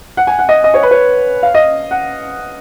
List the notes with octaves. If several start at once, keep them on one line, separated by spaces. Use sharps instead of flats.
F#5
G#5
F#5
D#5
D#5
C#5
B4
C#5
F5
D#5
F#5